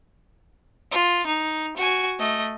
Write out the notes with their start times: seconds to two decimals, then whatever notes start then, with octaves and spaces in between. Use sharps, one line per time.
0.92 F4
1.26 D#4
1.77 F#4 G#5
2.19 A3 D#5